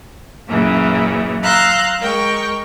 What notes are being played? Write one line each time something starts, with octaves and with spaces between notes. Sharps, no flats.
F#2 A#2 C#3 E3
F5 A#5 C6 E6 F#6 G6
G#3 A#4 G5 C#6